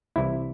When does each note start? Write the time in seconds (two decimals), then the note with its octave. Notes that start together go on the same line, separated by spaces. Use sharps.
0.16 C2 C3 E3 E4